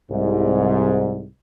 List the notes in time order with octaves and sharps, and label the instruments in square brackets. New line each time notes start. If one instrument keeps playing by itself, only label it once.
[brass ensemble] C2 G#2